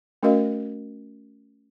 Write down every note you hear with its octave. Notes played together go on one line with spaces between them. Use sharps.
A3 C#4 F#4 A#4 D#5 F5